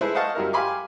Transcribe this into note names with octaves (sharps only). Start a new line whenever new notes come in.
G#3 E4 G#4 A4 B4 C5
C5 D#5 F5 F#5 A5 C#6
F#2 G3 E4 A#4
G4 F5 G#5 B5 C6 D6